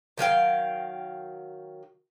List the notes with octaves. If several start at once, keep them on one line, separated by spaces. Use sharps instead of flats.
D#3 F#3 F5 G5